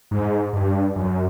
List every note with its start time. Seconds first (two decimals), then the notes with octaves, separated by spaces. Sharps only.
0.11 G#2
0.53 G2
0.96 F#2